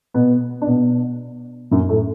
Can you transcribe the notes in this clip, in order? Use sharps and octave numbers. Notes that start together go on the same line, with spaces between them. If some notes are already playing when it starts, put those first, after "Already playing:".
B2 B3
D4
B2 B3
F#2 F#3
A2 A3